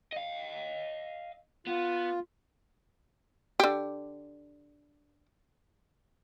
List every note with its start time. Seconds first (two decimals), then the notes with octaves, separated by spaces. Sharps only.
0.12 D#5 F5
1.67 B3 F4
3.60 D3 G4